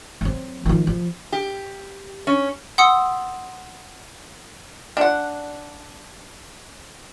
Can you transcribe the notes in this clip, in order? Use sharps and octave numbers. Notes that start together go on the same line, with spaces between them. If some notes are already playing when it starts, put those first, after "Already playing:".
F#3 C4
D#3 F3
F3
G4
C#4
F#5 C6 D#6 E6 C#7
D4 F#5